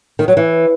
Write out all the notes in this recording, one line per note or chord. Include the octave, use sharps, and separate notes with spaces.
D#3
F#3
E3